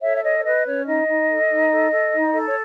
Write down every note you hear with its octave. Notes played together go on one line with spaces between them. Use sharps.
A4 C#5 E5
E5
C#5 D#5
C#5
B4 D#5
C#4 C#5
D#4 D#5
D#4
A4
D#4
A4
A4
D#4
A4
C#5